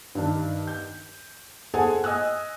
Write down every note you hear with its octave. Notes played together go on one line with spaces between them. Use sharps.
G2 D#3 D4
G6
G#4 A4 C5 F#5 G#5 A5
D#5 G#5 D#6 E6 F#6